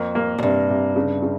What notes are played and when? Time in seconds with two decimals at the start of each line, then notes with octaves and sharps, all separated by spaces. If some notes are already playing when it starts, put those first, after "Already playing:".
Already playing: F2 A#3
0.15 A#3
0.38 F2
0.42 G2 C3
0.70 C3
0.96 C#3
1.22 C#3